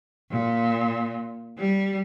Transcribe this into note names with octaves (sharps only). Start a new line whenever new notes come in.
A#2
G3